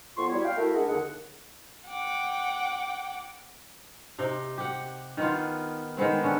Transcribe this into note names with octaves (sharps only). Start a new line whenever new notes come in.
F2 B3 F4 C6 C#6
G3 E4 F#4 C#5
F5 G5
A3 E4 F#4 A#4 E5
G#3 D4 G#4 A#4 F#5
D#2 D3 G#4 F#5
F#5 G5 D6
C3 D#4
G4 F#5
D#3 B3 F4
D#3 G#3 B3 C4
D3 C#4